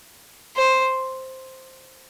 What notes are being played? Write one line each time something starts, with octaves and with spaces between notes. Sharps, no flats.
C5